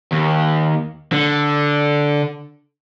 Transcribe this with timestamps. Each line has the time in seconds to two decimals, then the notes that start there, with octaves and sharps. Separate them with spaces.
0.12 D#2
1.12 D3